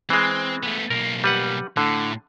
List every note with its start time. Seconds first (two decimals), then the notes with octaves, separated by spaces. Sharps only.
0.10 E3 G#3 C4
0.63 A3 B3
0.90 B1 A#3 A#4
1.24 G3 B4 F#5
1.77 A2 D3